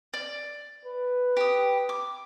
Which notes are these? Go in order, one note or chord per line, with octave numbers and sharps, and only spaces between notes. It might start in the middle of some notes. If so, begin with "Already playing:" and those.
D5
B4
G4 D#6
D6